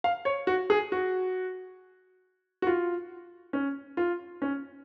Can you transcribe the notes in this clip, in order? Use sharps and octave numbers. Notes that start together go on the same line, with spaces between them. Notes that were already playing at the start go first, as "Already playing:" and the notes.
F5
C#5
F#4
G#4
F#4
F#4
F4
C#4
F4
C#4